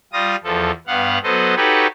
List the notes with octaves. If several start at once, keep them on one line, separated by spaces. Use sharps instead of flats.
G3 F4 D#6 A#6
E2 F3 A4
G2 B3 F5 F#5
F#3 B3 A4 C5 D#5
D#4 F#4 G4 A4 B4 C#5